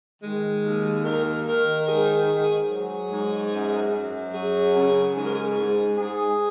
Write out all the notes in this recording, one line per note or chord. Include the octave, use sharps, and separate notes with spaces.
D#3 G#3
D#2
D#3 A#4
D#3 A#4
G#2 G#4
G#2
F#3 G#4
G#2
F#2
F#2
F#3 G#4
C#3
G#2 G#4
A#4
G#4
G#2
G#2 G#4